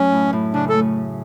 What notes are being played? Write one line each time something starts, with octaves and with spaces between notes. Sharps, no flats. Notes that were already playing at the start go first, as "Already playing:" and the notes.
Already playing: F#2 F#3 A3 C#4
A2
A2
C#3 D4
A4
A3